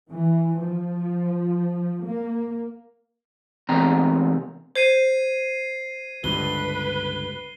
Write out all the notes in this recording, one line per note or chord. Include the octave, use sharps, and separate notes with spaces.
E3
F3
A#3
E2 C3 A#5
C5 G#6 C7 D#7
C#2 G2 D3 B4 G7